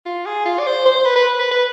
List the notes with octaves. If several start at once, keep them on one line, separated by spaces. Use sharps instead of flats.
F4
G#4
F4
D5
C5
C5
C5
B4
B4
B4
B4